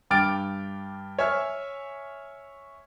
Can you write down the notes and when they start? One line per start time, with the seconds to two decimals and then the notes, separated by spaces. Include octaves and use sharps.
0.10 G2 G5 D6 F6 A6 D7
1.19 C#5 E5 G#5 F6